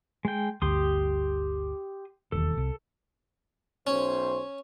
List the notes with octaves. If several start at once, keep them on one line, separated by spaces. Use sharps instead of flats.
G#3 G5
G1 D2 G4 C6 D#6
E1 D#2 A4
C2
B1 C#4 C5